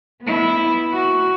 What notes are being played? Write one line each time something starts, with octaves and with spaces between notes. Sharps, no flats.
B3 E4
F#4